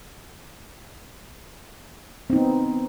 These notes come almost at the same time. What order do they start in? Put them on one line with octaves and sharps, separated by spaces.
C4 D#4 B3